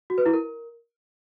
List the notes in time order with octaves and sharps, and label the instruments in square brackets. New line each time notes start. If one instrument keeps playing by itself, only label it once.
[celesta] F#4
B4
E4
A#4